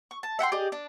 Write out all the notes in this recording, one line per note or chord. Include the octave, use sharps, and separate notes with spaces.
C#6
A5
E5 F#5 G5 C6
G4 G#4 D5 D#5
D4